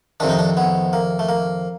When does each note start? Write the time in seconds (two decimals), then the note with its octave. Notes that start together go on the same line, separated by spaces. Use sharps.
0.20 F2 C3 D#3 D4
0.29 D#4
0.39 D4
0.57 B3
0.93 A#3
1.19 A3
1.29 A#3